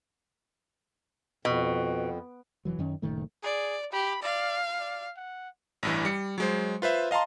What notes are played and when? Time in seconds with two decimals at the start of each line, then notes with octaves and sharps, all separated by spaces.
1.45 F2 B2
2.65 F1 E3 F#3
2.79 F#2 D#3 C#4
3.02 F#1 A#2 D#3 A3
3.43 G#4 D5
3.93 G4 B5
4.22 D5 F5
4.79 D5
5.17 F#5
5.83 A1 G2 E3
6.05 G3 C#7
6.38 F#3 G#3 C5
6.82 F4 B4 C5 E5
7.11 D#5 F5 A5 A#5 C6